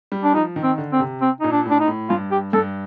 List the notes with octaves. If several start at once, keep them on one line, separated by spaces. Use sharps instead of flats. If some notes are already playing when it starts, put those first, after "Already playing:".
G3
D4
F3 D#4
D#3
C4
D3
C4
C3
C4
A#2 D#4
D4
A2 D4
D#4
A2
G2 F4
G4
G2 A4